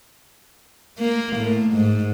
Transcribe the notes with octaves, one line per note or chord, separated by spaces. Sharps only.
A#3
A2
G#2